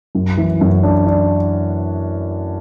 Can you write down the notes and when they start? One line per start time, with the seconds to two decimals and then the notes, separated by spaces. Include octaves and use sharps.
0.15 F#2
0.37 E3
0.61 F#2
0.83 D4
1.07 D4